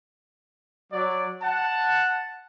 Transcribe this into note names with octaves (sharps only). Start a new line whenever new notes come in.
F#3 D5
F#5 A5